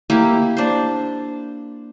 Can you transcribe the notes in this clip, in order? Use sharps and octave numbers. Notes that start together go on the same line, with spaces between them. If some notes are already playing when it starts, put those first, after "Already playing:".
A#3 E4 G4
D4 C5